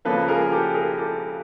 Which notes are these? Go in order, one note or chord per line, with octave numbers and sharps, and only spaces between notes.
C#2 C#3 F3 A#3 A4 B4
G#4 A#4
G4 A4
G#4 A#4
G4 A4